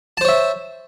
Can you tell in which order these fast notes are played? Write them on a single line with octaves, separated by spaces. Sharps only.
A5 C5 C#5 E5